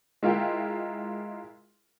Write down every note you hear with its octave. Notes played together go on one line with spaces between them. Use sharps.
G#3 E4 F4 A#4 F5 G5